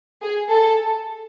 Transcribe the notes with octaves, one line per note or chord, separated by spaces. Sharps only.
G#4
A4